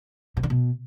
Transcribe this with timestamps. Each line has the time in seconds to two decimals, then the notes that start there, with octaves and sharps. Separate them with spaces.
0.37 B2
0.43 D3
0.50 B2